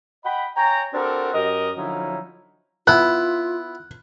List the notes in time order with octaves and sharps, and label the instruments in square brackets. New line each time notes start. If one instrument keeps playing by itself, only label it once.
[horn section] D#5 F#5 G5 B5
C#5 G5 G#5 A#5
C4 D4 F#4 G4 A4 A#4
F#2 G4 A#4 D#5
D3 F3 F#3 C#4 D#4 E4
[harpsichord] B3 E4 [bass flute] F4 [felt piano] F#6